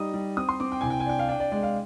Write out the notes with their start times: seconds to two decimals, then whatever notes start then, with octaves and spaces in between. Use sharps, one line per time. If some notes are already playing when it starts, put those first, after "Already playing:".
Already playing: G3 D#4 D#6
0.14 G3
0.37 C4 D#6
0.49 C6
0.60 C4 D6
0.72 G5
0.81 C2 G#5
0.90 G5
1.00 G#5
1.06 D4 G5
1.19 F5
1.29 D4 G5
1.40 D5
1.52 G#3 D5
1.63 F5